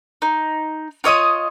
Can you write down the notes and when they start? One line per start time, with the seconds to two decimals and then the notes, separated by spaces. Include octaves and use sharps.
0.22 D#4
1.04 F4 C#5 D#5 D#6